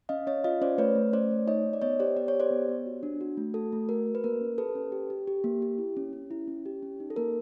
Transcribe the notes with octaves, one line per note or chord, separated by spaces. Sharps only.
C#4 D#5 F5
C#4 C#5 D#5
F4 D#5 F5
C#4 C5 D5
A3 B4 C#5
A3
C#4 C5 D5
A3
D#4 C#5 D#5
D#4
D5
B3 C#5 D#5
G4 C5 D5
B3 D5
C#5
G4
C5 D5
B3
B3
F#4
D4
F#4
A3
F#4 A4
A3
F#4 A#4
F#4
B4
A#3 A#4
C#4
G4 A4 B4
C#4
G4
G4
G4
A#3
G4
E4
C#4
C#4
E4
C#4
G4
C#4
D#4
A4
A#3 A#4